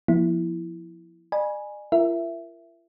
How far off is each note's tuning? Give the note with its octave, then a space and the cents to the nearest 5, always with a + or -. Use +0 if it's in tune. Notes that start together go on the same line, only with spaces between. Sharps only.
F3 +0 B3 -40 E4 +0
D5 +45 G#5 +0 B5 -25
F4 -45 A#4 +0 E5 +10